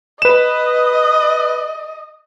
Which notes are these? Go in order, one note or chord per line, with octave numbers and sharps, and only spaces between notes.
B4 D#5 E7